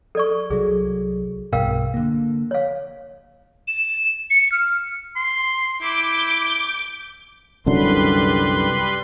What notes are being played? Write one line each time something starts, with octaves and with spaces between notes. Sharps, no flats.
A4 D5 C#6
C2 F#3 G#4
B1 G2 B2 A#4 F5 G5
D3 A#3
C#5 F5
E7
C#7
F6
C6
E4 D6 G6
C2 F#2 D3 G3 B4 C6